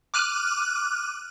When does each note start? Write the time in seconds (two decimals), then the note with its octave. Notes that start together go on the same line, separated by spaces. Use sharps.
0.14 D6 F6 F#6 D#7